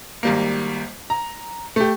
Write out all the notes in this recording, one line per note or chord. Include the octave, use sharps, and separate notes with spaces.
G#1 G3 A#3
A#5
A3 G4